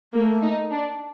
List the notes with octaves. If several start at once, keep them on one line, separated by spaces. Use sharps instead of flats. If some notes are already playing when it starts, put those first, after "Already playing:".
A3 A#3
D#4
D4